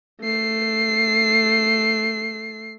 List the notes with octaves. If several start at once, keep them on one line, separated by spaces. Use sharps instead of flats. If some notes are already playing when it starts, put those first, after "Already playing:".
A3 C7